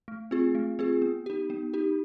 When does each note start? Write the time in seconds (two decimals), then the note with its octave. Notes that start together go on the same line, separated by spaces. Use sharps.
0.08 A3
0.31 C4 F4 G#4
0.55 A3
0.79 C4 F4 G#4
1.02 B3
1.26 D#4 G4
1.50 B3
1.74 D#4 G4